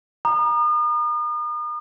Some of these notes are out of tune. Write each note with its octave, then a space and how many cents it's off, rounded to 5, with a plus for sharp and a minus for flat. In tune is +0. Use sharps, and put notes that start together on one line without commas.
A#5 +20 D#6 -40